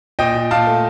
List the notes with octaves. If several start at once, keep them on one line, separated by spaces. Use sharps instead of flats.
A#2 D#5 G5
A#2
A#2 F5 A5
A3